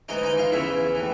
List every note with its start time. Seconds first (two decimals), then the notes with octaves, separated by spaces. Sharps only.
0.09 G#2 E3 D#4 D#5
0.23 D#4 D#5
0.38 F4 F5
0.52 E2 C#3 E3 E4 E5
0.95 A2 E3